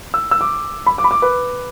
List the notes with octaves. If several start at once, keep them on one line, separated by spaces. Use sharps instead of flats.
E6
E6
D6
B5
D6
B5
D6
B4